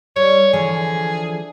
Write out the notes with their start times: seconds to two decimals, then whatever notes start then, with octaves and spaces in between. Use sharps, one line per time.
0.16 G3 C#5
0.53 D3 E3 F3 G#4